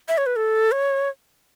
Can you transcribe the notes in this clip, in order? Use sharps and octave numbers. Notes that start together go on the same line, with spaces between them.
E5
C#5
B4
A4
C#5